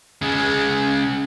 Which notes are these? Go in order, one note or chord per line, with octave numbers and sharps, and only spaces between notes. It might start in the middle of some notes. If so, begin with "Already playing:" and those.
C#3 G#3